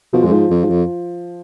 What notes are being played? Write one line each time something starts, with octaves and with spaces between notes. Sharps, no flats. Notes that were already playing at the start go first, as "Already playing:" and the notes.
B2 F3
F2 G#3
G#2 F3
F2
G#2
F2